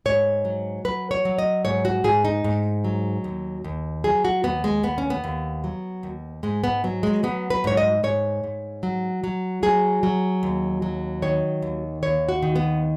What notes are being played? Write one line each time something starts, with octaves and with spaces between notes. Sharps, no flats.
G#2 C#5
F#3
F#3 B4
C#5
F#3
D#5
G#2 C#5
F#4
G#2 G#4
D#4
G#2
F#3
D#2
D#2
F#3 G#4
F#4
D#2 B3
G#3
D#2 B3
C#4
B3
D#2
F#3
D#2
G#2 G#3
B3
F#3
G#3
F#3 B3
B4
G#2 C#5
D#5
G#2 C#5
G#2
F#3
F#3
F#3 G#4
F#3
D#2
F#3
D#3 C#5
D#2
D#2 C#5
F#4
D#3
B3